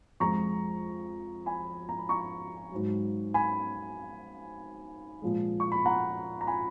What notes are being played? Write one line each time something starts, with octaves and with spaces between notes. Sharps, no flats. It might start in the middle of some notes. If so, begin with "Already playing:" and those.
F2 F3 G#3 A#5 C#6
G#5 B5
A#5
B5
A#5 C#6
G#2 F#3
G#5 B5
A#2 F3 G#3
C#6
B5
F#5 A#5
A#5
G#5 B5